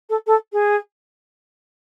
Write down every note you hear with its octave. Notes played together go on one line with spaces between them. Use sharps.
A4
A4
G#4